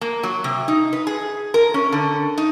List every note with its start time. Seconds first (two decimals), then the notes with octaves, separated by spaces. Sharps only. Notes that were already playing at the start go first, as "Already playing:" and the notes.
0.01 A#3
0.23 F#3
0.44 C3
0.68 D#4
0.93 B4
1.07 G#4
1.54 A#4
1.74 C#4
1.92 D3
2.38 D#4